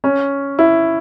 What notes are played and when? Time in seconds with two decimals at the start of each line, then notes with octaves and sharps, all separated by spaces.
0.04 C#4
0.59 E4